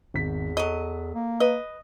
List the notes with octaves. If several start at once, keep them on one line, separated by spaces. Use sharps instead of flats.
G#1 E2 B6
F#3 A4 D#5
A#3
B4 D#5